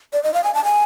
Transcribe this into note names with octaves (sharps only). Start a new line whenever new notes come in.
D5
D#5
F5
G#5
A5
G#5